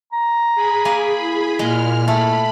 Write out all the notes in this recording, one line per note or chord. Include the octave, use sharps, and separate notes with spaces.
A#5
G#4 B5
A#3 G#5
E4
A#2 G#3 F6
A3 B5